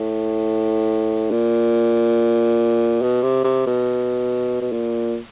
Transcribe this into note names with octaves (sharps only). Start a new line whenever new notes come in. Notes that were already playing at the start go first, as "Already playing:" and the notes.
Already playing: A2
A#2
B2
C3
C3
B2
B2
A#2